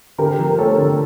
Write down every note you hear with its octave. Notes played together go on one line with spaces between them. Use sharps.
D3 G4 A#4
F3
A#4
A3 A4 C#5
D3